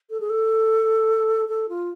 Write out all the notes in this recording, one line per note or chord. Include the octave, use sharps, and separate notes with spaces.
A4
G#4
A4
A4
F4